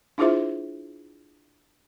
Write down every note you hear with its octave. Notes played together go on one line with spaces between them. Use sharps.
D4 E4 F4 G#4 C5 E5